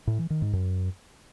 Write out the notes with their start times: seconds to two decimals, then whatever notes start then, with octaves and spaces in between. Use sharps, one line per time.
0.07 A2
0.19 E3
0.30 D#3
0.42 G#2
0.53 F#2